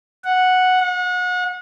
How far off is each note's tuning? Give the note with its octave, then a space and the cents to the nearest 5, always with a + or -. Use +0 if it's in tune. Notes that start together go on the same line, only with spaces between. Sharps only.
F#5 -5
F#5 -35